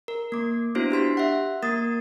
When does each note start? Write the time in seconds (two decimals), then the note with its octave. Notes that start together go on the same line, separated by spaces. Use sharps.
0.08 A#4
0.32 A#3 D6
0.75 B3 D4 E4 F#4 C5
0.91 D4 G4 C6 B6
1.17 E5 F#5
1.62 A#3 A#4 D#6 A6